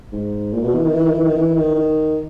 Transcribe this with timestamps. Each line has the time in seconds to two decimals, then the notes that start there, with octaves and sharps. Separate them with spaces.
0.12 G#2
0.53 A#2
0.64 B2
0.74 E3
0.84 D#3
0.94 E3
1.05 D#3
1.14 E3
1.24 D#3
1.35 E3
1.56 D#3
1.75 D#3